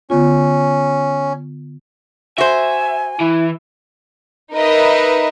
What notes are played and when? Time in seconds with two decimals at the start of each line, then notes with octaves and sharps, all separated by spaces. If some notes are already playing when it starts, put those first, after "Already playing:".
0.10 D3 B3 C#4 F4
2.38 F#4 C5 E5 G#5
3.20 E3 E4
4.54 D#4 A#4 B4 D#5 E5